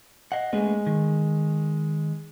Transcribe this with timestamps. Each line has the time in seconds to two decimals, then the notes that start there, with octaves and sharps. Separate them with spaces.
0.32 D#5 F#5
0.53 G#3 A3 B3 C#4
0.87 D#3